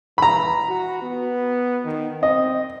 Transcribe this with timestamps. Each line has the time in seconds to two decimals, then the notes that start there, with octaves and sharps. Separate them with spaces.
0.18 E3 A#5 B5
0.69 F#4
1.02 B3
1.85 D#3
2.23 C4 D#5